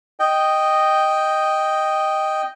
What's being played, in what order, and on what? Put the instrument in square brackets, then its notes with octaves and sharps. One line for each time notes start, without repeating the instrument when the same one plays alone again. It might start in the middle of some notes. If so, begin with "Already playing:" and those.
[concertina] D#5 G5